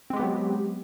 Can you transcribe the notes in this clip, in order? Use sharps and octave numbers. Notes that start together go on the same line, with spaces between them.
F#3 G#3 B3 C4 G4